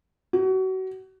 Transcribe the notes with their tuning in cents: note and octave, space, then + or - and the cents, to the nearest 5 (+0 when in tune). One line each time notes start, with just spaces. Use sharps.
F#4 +30